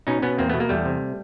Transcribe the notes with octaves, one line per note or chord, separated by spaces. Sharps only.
B2 C#4 D#4
B2 B3 C#4
E2 A#3 C4
B2 A3 B3
A#3
E2 G3 A3
C3